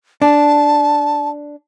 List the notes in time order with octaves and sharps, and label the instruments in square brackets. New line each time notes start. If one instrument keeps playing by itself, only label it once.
[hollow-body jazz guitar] D4 [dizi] A5